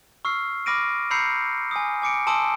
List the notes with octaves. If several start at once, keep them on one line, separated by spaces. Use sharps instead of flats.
C#6 E6 F6 C7
B5 D6 F6 A#6 D7 D#7
A#5 B5 E6 G6 C7 C#7
G#5 D#6
G#5 D6 C#7 D7
G#5 A5 C6 D#6 E6 D7